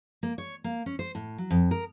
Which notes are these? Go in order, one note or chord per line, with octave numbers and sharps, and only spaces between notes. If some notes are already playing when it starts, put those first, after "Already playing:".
A#3
C#5
A#3
C#4
C5
A2
F#3
F2
A#4